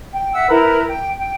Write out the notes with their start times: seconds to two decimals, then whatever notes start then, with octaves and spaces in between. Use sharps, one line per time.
0.13 G5
0.32 E5 F#5 E6
0.49 E4 A#4 B4
0.90 G5
1.20 G5